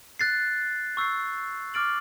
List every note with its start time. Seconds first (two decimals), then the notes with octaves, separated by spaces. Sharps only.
0.19 F#6 A6 C7
0.97 C#6 E6 G6 C7
1.74 D6 F6 A6 D7 F#7